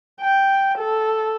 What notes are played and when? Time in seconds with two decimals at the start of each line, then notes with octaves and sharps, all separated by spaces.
0.21 G5
0.78 A4